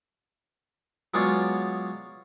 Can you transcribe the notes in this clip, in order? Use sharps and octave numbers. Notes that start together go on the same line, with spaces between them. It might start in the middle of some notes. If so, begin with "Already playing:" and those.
F#3 G#3 B3 F4 C#5 D5